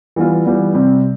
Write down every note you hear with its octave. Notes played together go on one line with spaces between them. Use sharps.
E3 G3 B3 F4
E3 G3 B3 F4
C3 G3 C4